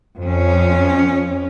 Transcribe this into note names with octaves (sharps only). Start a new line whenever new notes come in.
F2 C#4